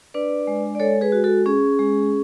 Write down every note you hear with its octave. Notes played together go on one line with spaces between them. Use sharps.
D4 B4 D5
G#3
D5
G#3 A4 C#5
G#4 B4
F#4
F#4 A4
C#4 G#4
G#3